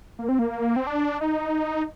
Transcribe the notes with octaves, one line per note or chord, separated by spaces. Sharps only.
A#3
C4
A#3
C4
D4
D#4